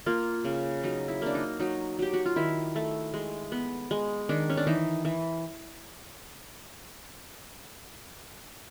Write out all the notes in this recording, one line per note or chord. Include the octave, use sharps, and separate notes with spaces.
A#3 F4
C#3
F#3 D#4
E4
A#3 D4
D#4
F#3 D#4
F#3 G4
F#4
F4
D#3 E4
A3
G#3
B3
G#3
D#3 D4
C#4
D4
E3 D#4
E3